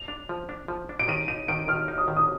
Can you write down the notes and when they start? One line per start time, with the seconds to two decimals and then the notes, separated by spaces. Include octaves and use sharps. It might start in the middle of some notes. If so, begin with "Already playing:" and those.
Already playing: F7
0.08 D4
0.29 F3
0.49 D4
0.68 F3
0.89 D4
0.99 D7
1.08 D#3 D#7
1.28 D#4 D#7
1.48 D#3 D7
1.68 D#3 F6
1.88 D#4
1.98 D#6
2.08 D#3
2.17 D#6